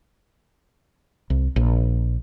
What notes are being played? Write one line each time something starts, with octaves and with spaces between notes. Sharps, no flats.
C2
A#1